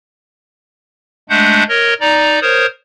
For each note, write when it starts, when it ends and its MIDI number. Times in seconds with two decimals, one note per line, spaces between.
1.30 1.63 56
1.30 1.63 57
1.30 1.63 62
1.30 1.63 78
1.30 1.63 91
1.69 1.94 70
1.69 1.94 73
1.69 1.94 75
2.01 2.39 63
2.01 2.39 74
2.01 2.39 82
2.42 2.66 70
2.42 2.66 72
2.42 2.66 73
2.42 2.66 87